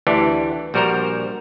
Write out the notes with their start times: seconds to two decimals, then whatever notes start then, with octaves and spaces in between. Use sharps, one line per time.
0.07 D2 E3 D4 G4
0.74 A#1 G3 F#4 A#4 C5 A#5